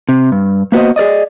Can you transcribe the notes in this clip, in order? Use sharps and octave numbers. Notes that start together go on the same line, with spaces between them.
C3
G2
A#3 B3 F#4 C5 D#5
G#4 A#4 D5 D#5